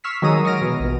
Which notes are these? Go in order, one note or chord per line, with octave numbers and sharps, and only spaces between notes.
C#6 E6 F6 B6 C7
D#3 F#3 G#3 A#5 D#6
C#6 D#6 F6 A#6 D7
B2 E3
A#1 B2